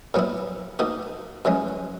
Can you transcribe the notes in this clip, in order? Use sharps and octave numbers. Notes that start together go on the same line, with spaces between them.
A#2 F#3 B3 E4
B2 A#3 D#4 F#4
F#2 E3 G#3 C#4